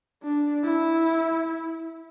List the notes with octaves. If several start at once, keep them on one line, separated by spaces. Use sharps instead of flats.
D4
E4